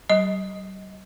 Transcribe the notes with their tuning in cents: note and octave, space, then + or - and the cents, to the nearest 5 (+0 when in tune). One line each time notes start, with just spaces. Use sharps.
G3 -45 D#5 +20